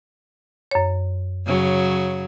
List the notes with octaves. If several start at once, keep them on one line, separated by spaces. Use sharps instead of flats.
F#2 C#5
C#3 F#3